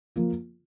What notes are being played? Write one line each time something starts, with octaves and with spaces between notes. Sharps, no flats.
F3 A#3 F4